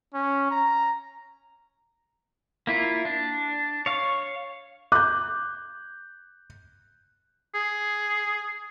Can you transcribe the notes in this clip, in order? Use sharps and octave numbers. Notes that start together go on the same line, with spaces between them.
C#4
A#5
A#3 E4 F4
D4
C#5 F5
D6 F#6 G6
G#4